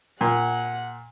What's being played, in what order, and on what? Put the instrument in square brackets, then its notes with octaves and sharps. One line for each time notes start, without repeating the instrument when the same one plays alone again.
[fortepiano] A#2 [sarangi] F#5